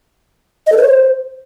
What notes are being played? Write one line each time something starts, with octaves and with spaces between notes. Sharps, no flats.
D#5
A4
B4
C#5
C5